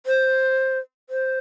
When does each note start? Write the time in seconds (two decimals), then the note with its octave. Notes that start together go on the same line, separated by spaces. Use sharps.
0.06 C5
1.09 C5